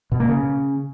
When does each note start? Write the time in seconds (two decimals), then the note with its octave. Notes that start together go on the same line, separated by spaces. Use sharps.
0.12 B2
0.20 A#3
0.28 C#3